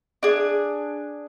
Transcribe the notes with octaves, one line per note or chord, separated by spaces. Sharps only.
D4 G#4